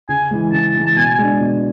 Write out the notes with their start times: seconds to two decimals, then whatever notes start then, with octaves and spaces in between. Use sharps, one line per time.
0.09 C#3 G#5
0.31 E3 G#3
0.52 C#3 A5
0.75 E3 G#3
0.85 A5
0.96 B2 G#5
1.18 G#3 D4
1.40 B2